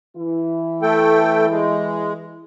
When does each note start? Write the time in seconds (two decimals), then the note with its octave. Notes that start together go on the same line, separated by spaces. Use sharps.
0.16 E3 E4
0.82 A3 A4 G5
1.50 G#3